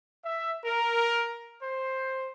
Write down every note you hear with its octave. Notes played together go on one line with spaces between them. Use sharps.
E5
A#4
C5